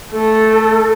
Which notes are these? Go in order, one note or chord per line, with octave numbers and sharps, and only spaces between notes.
A3 A4